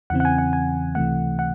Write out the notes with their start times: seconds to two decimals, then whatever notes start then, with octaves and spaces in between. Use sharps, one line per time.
0.10 E2 C#3 E3 C4 F#5
0.20 F#5
0.25 G#5
0.38 F#5
0.53 G#5
0.95 C#2 C3 E3 A3 F#5
1.39 F#5